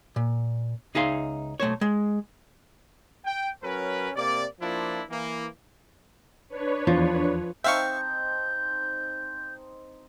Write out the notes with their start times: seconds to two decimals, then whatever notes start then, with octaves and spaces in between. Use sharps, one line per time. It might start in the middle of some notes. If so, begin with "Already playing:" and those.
0.16 A#2
0.95 C#2 D#4 G#4 E5 F5 C6
1.60 B1 A3 C5 C#5
1.81 G#3
3.25 G5
3.63 F#3 C#4 A#4 B4
4.16 C3 A#3 D5
4.61 F3 A#3 D4 E4 F4
5.09 E3 A#3
6.49 D4 B4 C#5
6.87 E2 F3
7.64 C4 D#4 E5 F5 A5 C#6 G6